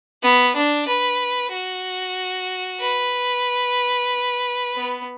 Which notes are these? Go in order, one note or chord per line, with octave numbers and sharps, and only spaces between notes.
B3
D4
B4
F#4
B4
B3